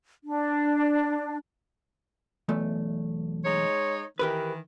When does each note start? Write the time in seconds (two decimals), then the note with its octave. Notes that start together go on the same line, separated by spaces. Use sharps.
0.24 D4
2.49 B1 E2 A3
3.45 G#3 D#4 C#5
4.19 D#3 E3 G4 A#4 B4